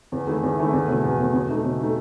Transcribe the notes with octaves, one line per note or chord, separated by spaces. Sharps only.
E2
D#3 A3 E4 G#4
E2
D#3 A3 E4 G#4
E2
B2 A3
E2
B2 A3
B2
A3 D#4 A4
B2
A3 D#4 A4